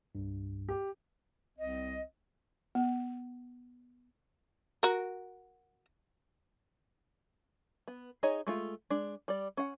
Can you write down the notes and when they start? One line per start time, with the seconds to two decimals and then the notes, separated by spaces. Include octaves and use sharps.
0.15 C2 G2
0.69 G4
1.59 C2 C4 D#5
2.75 B3
4.83 F#4 A#4
7.88 B3
8.23 D#4 G#4 C#5 D#5
8.47 G#3 A3 F4
8.90 G#3 D4
9.28 G3 D5
9.57 C#4 F#5